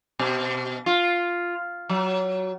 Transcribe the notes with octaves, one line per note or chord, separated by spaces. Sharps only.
B2
F4
F#3